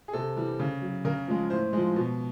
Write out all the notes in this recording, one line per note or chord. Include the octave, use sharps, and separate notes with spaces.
G#4
C3 A4
E3 G3
C#3
F#3
C#3 A#4
F3 G#3
A2 C5
F3 G#3
B2